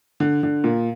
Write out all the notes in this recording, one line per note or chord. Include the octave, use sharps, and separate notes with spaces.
D3
D3
A#2